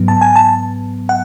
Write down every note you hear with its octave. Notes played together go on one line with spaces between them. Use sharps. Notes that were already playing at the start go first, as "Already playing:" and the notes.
Already playing: G#2 F#3 B3
A5
G#5
A5
F#5